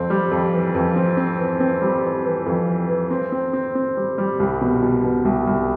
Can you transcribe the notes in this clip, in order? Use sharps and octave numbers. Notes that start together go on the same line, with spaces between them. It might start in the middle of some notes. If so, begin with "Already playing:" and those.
Already playing: F2 C4
G3
F2
E3
F2
C4
C4
E3
C4
G3
E3
E3
F2
E3
E3
C4
C4
C4
C4
G3
G3
C2
B2
B2
B2
C2
C2